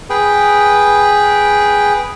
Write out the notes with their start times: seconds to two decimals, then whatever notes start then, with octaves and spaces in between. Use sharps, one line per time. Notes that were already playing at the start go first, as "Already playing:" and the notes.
0.10 G#4 B4 G5